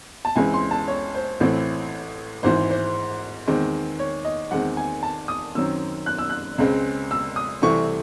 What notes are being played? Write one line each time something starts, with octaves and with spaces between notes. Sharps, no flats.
A5
C#2 C#3 E3 G#3 C4 G#5
C6
A5
C#5
C5
A1 A2 E3 A3 C4
G#1 G#2 E3 C5
C5
E2 D#3 G#3 C4
C#5
D#5
E2 D#3 G#3 C4 F#5
G#5
A5
D#6
F#2 D#3 F#3 C4 E6
F#6
E6
F#6
C#2 C#3 G#3 C4
E6
D#6
C2 C3 E3 A3 C4 C#6